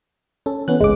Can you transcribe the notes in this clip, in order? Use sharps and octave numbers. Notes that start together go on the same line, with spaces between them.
C#4 A4
E3 B3 C#4 F#6
G1 C#2 G#3 D6